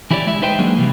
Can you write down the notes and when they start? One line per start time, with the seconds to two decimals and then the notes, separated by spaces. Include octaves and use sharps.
0.10 E3 E4 G4 C#5 D5
0.27 G#3 E4 E5
0.42 D#4 E4 B4 C5 D#5 G5
0.59 F#3 G#3 A#3 D4 G#4
0.78 C3 E3 G3